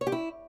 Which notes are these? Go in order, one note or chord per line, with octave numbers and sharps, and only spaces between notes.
C#5
G4
E4